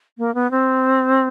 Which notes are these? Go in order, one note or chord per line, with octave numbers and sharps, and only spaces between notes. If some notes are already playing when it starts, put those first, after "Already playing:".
A#3
B3
C4